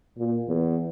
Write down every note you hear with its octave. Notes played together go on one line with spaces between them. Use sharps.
A#2
E2